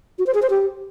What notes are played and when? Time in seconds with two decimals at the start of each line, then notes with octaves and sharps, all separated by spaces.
0.19 F#4
0.27 C5
0.34 G#4
0.42 C5
0.50 G4